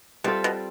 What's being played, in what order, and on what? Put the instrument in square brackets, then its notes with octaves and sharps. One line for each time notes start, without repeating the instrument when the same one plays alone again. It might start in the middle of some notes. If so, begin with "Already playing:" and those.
[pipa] B2 [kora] G3 C4 F4 A4
[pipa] B2